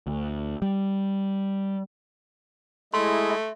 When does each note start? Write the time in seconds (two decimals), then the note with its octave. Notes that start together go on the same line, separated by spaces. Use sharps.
0.07 D2
0.62 G3
2.94 G#3 A3 E4 D#5 C6
3.30 E5